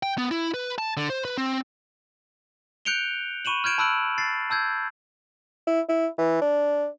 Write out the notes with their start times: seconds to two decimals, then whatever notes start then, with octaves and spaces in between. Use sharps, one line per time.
0.03 G5
0.18 B3
0.31 E4
0.54 B4
0.78 A5
0.97 D3
1.10 C5
1.25 B4
1.38 C4
2.85 F#6 G6 C#7 D7 F7 G7
3.45 B5 C#6 D#7 E7 F#7
3.64 F6 G6 G#6 D7 E7
3.78 A5 B5 E6 F#6 D7 F#7
4.18 A6 C7
4.50 A5 E6 G6 G#6
5.67 E4
5.89 E4
6.18 E3
6.42 D4